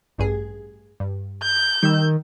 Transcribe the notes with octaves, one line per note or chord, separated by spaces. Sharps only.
A1 G2 G#4
G2
G6
D#3 G3 E6